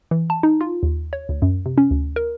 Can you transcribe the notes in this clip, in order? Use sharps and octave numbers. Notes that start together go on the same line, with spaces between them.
E3
A5
D#4
F4
D#2
C#5
D2
F#2
C3
C#4
D2
A#4